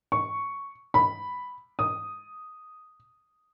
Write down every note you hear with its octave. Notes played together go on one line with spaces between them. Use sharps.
C#6
B5
D#6